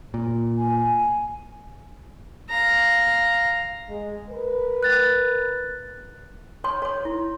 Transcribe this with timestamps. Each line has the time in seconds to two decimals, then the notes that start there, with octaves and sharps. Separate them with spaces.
0.14 A#2
0.58 G#5
2.49 F5 A#5
3.89 G#3
4.30 A#4 B4
4.83 F#6 A6
6.64 C#5 C6
6.82 C#5 C6
7.05 E4